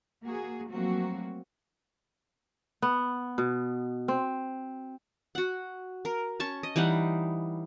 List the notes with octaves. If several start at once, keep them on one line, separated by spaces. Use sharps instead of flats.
A#3 F#4 G#4
F3 F#3 A3 A#3 C4 F#4
B3
B2
C4
F#4 F#5
A#4
C#4 A5 C#6
D#5
E3 G3 D#4 F#5